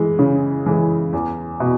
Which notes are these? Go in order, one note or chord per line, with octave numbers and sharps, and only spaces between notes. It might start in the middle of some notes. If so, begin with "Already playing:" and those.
Already playing: E3 G#3
C#3
E3 G#3
E2
B2